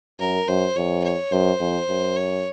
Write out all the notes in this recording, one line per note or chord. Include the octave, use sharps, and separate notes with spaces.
F#2 A#4
F#2 C5
F2 C#5
C#5
F#2 C5
F2
F#2
C#5